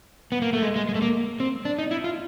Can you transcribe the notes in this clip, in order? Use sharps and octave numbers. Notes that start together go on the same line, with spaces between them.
B3
A#3
A3
G#3
G#3
G#3
A3
A#3
C4
D4
D#4
E4
F4